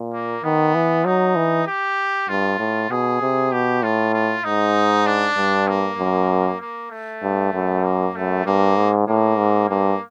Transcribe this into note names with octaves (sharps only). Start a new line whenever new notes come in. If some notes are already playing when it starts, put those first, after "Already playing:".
Already playing: A#2
A#3
D#3 B3
E3
F#3 D#4
E3
G4
G2 F4
A2
B2 G#4
C3
B2 G4
A2 F4
F4
G#2 D#4
D4
G2
A#3
F#2
A#3
A3
G2
F#2
A#3
F#2 A3
G2 A#3
G#2
A2 A#3
G#2
G2 A#3